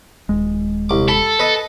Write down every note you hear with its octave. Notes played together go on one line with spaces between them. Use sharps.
D#1 G#3
C2 D6
A4 B5
B4 D#5